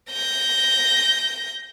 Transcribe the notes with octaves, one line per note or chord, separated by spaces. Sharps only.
G6 A#6